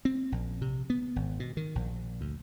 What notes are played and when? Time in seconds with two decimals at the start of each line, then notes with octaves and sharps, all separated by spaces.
0.05 C4
0.32 A#1
0.62 C3
0.90 B3
1.16 G#1
1.40 B2
1.57 D#3
1.75 A#1
2.21 D2